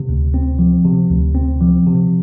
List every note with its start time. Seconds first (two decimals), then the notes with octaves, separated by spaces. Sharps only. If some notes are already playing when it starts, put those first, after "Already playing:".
Already playing: C3
0.09 D2
0.34 C4
0.59 F3
0.85 C3
1.10 D2
1.35 C4
1.61 F3
1.86 C3